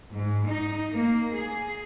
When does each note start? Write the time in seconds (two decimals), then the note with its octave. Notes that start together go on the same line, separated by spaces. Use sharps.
0.13 G#2
0.47 D#4
0.91 A#3
1.33 G#4